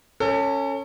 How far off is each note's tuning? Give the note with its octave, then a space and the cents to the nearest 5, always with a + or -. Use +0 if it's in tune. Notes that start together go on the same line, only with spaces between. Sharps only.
C#4 +0 A4 +35